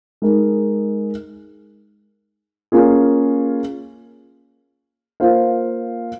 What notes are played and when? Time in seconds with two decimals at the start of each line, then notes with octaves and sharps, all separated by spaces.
0.22 G#3 D#4 A#4
2.72 A#3 C#4 F4 G#4
5.20 A#3 F4 C5 F5